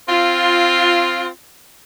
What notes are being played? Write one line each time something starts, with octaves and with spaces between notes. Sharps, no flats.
C4 F4